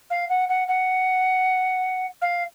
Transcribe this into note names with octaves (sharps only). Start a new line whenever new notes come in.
F5
F#5
F#5
F#5
F5